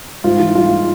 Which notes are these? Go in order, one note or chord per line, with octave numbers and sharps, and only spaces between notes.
G#2 F4
E3
G#3 F4